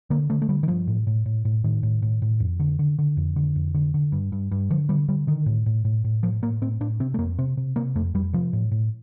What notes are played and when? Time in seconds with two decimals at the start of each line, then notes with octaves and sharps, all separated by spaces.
0.10 D3 A#3
0.30 D3 A3
0.42 A3
0.49 D3 G3
0.63 D#3
0.68 G2 F3
0.87 A2
1.07 A2
1.26 A2
1.45 A2
1.64 A2 D#3
1.83 A2
2.02 A2
2.22 A2
2.40 F2
2.60 D3
2.79 D3
2.99 D3
3.17 F2
3.36 D3
3.56 F2
3.74 D3
3.94 D3
4.12 G2
4.32 G2
4.51 G2
4.70 D3 F3
4.89 D3 G3
5.08 D3 G3
5.27 D3 D#3
5.46 A2
5.66 A2
5.85 A2
6.04 A2
6.23 A2 F3
6.42 A2 A#3
6.61 A2 C4
6.80 A2 D4
7.00 C3 C4
7.14 A3
7.18 F2 A#3
7.39 C3 C4
7.57 C3
7.76 C3 A#3
7.96 F2 A3
8.14 F2 G3
8.33 C3 F3
8.53 A2
8.71 A2